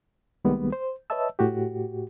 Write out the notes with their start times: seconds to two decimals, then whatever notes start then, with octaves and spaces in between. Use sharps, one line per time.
0.44 C2 D#3 G3 G#3 A#3 B3
0.72 C5
1.10 B4 C#5 D#5 E5 A5 E6
1.39 A2 F#4 G4